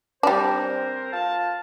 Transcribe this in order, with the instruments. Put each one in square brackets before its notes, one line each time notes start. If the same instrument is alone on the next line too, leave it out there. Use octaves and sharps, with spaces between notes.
[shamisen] G3 D4 [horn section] C4 A#4 C5
[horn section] F4 F5 A5